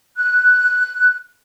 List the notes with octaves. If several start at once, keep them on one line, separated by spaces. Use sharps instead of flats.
F#6